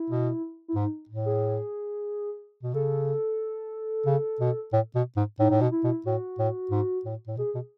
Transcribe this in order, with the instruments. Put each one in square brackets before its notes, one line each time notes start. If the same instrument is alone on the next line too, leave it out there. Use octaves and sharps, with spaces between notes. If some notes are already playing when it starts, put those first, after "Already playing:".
Already playing: [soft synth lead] E4
[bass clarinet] B2
[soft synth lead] E4
[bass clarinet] G#2 [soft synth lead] D#4
[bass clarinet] A2
[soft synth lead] G#4
[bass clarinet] B2
[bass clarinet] C#3 [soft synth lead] A4
[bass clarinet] C#3
B2
A2
B2
G#2
[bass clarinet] A2 [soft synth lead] D#4
[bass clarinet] A2
B2
[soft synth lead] E4
[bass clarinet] B2
[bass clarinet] A2 [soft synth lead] F#4
[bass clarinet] A2
G#2
A2
A2
[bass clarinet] B2 [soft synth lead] G#4
[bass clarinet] B2